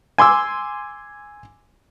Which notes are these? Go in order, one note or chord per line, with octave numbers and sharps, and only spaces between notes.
G#5 C6 D6 E6